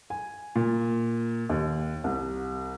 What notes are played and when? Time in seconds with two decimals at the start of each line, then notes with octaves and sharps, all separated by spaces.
0.10 G#5
0.56 A#2
1.50 D#2
2.04 C2